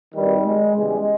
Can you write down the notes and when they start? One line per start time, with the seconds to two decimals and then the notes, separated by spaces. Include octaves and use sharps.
0.15 G#1 G2 D#3 G3
0.45 G#3
0.76 E2 C#3 E3 G3 G#3